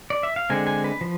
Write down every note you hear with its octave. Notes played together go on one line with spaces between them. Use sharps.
D5
E5
F5
D3 G#3 C4 G#5
G#5
B4
F3